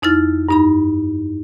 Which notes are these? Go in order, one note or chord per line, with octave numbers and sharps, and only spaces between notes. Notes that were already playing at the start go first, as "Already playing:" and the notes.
F2 D#4 E4 F6 A6
G2 D#4 B5